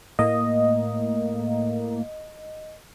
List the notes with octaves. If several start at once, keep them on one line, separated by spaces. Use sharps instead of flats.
A2 A#3 D#5